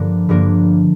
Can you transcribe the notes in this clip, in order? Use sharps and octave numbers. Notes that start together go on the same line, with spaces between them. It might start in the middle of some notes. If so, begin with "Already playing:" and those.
Already playing: G2 D3 F3 A#3 D4
G2 D3 F3 A#3 D4